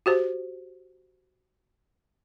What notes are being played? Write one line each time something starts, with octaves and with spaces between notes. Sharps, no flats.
F#4 G4 C5